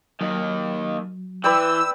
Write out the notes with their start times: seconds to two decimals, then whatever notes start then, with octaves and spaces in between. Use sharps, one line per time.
0.21 D#2 D#3 F#3
1.44 E3 B4 D5 G5 E6